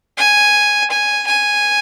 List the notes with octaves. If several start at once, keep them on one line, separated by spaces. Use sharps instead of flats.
G#5
G#5
G#5